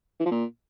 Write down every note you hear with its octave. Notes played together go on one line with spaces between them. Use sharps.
E3
F3
A#2